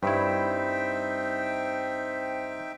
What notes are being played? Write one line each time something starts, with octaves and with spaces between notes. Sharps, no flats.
G2 C4 D#4 E4 E5 G5